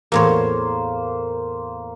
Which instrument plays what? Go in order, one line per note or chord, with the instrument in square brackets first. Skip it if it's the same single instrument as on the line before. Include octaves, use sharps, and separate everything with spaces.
[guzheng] E2 A2 C#5 [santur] A#3 C5